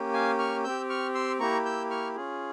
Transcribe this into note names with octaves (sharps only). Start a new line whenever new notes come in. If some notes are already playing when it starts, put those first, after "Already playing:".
Already playing: A#3 C#4 G4
F5 G#5
C#6 F6
C4 G4 E6 G6
C#6 F6
C6 E6
A#3 E4 G4 A#5 C#6
E6 G6
C#6 F6
C#4 F4 G#4